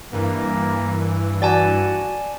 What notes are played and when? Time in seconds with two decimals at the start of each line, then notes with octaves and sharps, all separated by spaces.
0.13 G2 E3 A#3
1.42 F#4 D5 G#5 A5